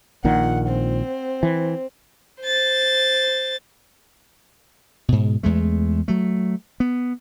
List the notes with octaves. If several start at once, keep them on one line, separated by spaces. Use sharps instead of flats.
A#1 A#2 D#3 F#5
C4
E3
C5 A6
G#2 B2
E2 G#3 A3
F#3 A3
B3